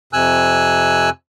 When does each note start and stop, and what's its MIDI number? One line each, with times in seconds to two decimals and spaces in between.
0.13 1.10 41
0.13 1.10 48
0.13 1.10 80
0.13 1.10 88
0.13 1.10 90